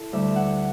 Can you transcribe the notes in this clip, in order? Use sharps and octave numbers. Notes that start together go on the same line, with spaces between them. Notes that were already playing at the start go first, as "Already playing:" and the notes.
Already playing: E4 A4
D2 D3 G3 E5
F#5